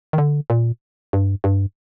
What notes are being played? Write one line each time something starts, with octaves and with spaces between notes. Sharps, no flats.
D#3
D3
A#2
G2
G2